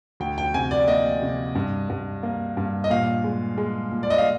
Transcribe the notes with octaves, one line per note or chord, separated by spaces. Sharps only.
D2 G5
G5
C3 G#5
D5
A#3 D#5
C3
G2
G2
A#3
G2
D#5
A#2 F5
G#3
G#3
A#2
D5
D#5
F5